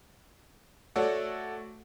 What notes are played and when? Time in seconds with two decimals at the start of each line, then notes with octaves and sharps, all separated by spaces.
0.96 A3 F#4 A4 C#5 D5 F#5